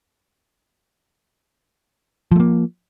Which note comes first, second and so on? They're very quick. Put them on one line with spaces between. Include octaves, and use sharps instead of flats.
F3 A3 A#3